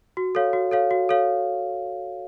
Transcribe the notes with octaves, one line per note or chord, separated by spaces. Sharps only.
F#4
A4 C#5 F5
F#4
A4 C#5 F5
F#4
A4 C#5 F5